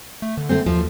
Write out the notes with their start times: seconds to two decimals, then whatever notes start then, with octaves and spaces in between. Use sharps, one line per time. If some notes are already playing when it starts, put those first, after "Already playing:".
0.22 A3
0.37 D3
0.49 A3 C4
0.66 D#2 F3